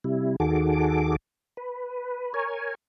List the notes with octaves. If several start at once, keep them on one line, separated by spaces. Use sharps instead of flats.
C3 G3 E4
D#2 D#3 F#4 G#4 A4 D6
B4
A#4 C#5 G#5